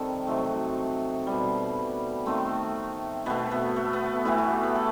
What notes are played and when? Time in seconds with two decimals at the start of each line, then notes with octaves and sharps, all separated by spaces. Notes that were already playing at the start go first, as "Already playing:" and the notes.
Already playing: C3 D#3 G3 A4
0.27 C3 F#3 A3 D#4
1.27 B2 G3
2.26 D#3 A3 C4
3.26 B2 A3 B3
3.51 B3
3.76 A3
3.93 B3
4.25 A2 E3 A3 E4
4.38 F#4
4.50 G4
4.63 B4
4.75 A4